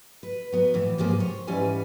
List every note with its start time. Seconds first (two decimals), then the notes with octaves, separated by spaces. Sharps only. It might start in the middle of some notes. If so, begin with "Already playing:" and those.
0.23 B4
0.52 F#3 B3
0.74 A2 E3
0.98 G#2 C3 F3 A#3 G#4
1.19 C5 C#5
1.47 G#2 E3 G3 C#4 B4 G#5